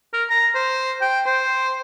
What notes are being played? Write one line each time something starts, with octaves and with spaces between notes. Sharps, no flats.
A#4
A#5
C5
G5
C5